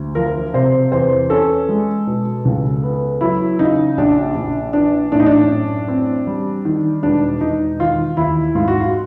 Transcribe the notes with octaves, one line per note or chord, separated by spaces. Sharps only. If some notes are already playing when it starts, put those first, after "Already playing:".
Already playing: D2
F3 A#4
C3 C5
E2 C5
C#4 A4
G#3
B2
C#2
B3
F#3 E4
C#3 D#4
A#1 D4
A#1
E3 D4
A2 D4
D#4
D4
F#2
C4
G3
D#3
E1 D4
E1 D#4
D#3 F4
D#2 E4
G#2 F4
F#4
F4